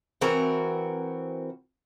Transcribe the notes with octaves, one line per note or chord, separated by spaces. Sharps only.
E3 C4 F#4 A#4